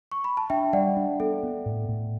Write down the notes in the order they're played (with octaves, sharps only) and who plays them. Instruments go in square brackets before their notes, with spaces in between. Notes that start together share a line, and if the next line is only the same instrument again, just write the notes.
[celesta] C#6
B5
A5
[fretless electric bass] D4 [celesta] E5 G5
[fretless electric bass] G3 [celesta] D5 F#5
[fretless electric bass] D4
[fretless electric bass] B3 [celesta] A4
[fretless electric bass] B3
A2
A2